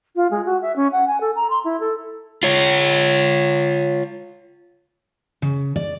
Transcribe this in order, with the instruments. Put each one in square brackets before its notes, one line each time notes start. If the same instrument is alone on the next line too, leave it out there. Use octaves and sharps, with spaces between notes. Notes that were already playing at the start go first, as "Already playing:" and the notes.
[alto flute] F4
G#3
F#4
E5
C#4
F#5
G#5
A4
A#5
C6
E4
A4
[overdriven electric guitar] F4 C#5
[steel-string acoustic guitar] C#3
D5